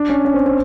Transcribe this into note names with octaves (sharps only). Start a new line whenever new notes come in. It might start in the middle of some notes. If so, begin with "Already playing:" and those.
Already playing: D4
C#4
C#4
C4
C4